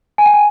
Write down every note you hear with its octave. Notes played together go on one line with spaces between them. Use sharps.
G#5
G5
G#5